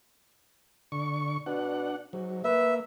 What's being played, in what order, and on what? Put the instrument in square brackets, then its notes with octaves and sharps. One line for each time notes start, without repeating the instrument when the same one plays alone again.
[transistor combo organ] D3 C#6
[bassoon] B2 [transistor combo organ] D4 F#5
[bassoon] G#2 [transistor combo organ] F#3
[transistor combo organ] A#3 [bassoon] B4 [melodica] E5